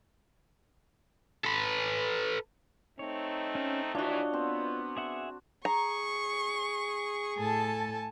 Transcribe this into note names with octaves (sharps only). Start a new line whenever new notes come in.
A4 B4
A3 C4 D#4 C#5
C#4
D#2 E3 D4 F4 F#4 C#5 D#5
B3 C4
G#4 E5 F#5
G#4 A#5 C#6
A2 A4 G#5 A5